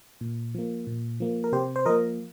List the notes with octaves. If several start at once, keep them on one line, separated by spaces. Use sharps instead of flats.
A#2
F3 A#3
A#2
F3 A#3
A#4
C3 G4 C5
C5
F3 A#3 A#4 D#5